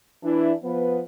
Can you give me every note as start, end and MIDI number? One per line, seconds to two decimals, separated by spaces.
0.24 0.52 52
0.24 0.52 62
0.24 0.52 64
0.64 1.02 53
0.64 1.02 59
0.64 1.02 71